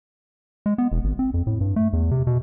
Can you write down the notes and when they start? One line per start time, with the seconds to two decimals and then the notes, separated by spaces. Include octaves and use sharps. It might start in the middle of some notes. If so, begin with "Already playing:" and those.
0.66 G#3
0.78 B3
0.92 E1
1.04 G#1
1.19 C4
1.34 F2
1.47 A2
1.61 G2
1.76 A3
1.93 E2
2.11 C3
2.27 B2